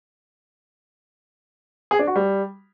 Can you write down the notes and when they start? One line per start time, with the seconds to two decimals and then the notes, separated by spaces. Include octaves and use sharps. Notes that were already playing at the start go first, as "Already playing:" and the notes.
1.91 G#4
1.99 D4
2.07 F#4
2.16 G3